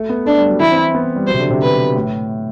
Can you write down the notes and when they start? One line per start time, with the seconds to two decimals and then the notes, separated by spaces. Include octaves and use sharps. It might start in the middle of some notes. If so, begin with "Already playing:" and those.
Already playing: A3
0.09 B3
0.26 A3 D4
0.37 G3
0.49 F#3
0.60 E3 E4
0.72 C4
0.94 B3
1.16 G3
1.27 F#3 C5
1.34 C3
1.39 D3
1.51 C3
1.62 B2 B4
1.96 A2